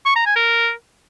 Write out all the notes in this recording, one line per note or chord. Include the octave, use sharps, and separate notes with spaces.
C#6
A#5
G#5
A#4